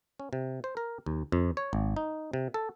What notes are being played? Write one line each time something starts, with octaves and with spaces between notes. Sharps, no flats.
C#4
C3
C5
A#4
D#2
F2
C#5
G#1
D#4
C3
A4